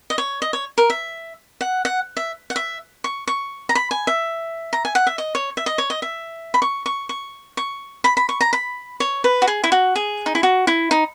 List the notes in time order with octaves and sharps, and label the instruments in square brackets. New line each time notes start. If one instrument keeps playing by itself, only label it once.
[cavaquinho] D#5
C#5
D#5
C#5
A#4
E5
F#5
F#5
E5
F#5
E5
C#6
C#6
A#5
B5
G#5
E5
A#5
G#5
F#5
E5
D#5
C#5
E5
D#5
C#5
D#5
E5
B5
C#6
C#6
C#6
C#6
B5
B5
C#6
A#5
B5
C#5
B4
F#4
G#4
E4
F#4
G#4
D#4
E4
F#4
E4
D#4